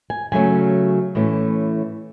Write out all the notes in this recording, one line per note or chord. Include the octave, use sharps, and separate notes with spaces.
G#5
C#3 F#3 A3 C#4 G#5
A2 E3 A3 C#4